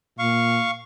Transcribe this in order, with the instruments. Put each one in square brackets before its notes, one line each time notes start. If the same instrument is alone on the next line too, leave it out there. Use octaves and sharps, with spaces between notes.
[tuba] A#2 [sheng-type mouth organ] F5 C#6